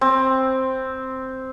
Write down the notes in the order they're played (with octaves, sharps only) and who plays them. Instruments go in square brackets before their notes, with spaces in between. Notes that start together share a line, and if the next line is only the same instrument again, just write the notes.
[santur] C4